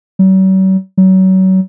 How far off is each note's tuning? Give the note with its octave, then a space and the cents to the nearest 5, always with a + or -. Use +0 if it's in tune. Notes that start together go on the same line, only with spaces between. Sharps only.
F#3 +45
F#3 +30